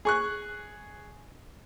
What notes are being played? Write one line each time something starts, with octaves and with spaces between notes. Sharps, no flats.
G#4 C#6 F#6